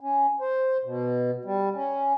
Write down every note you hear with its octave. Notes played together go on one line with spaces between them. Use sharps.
C#4
C5
B2
G3
C#4